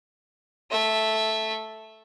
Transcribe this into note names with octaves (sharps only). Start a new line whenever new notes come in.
A3 E5